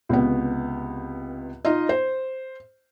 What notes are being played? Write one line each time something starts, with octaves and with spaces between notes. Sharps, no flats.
C#2 C3 B3
D#4 F4 D#5
C5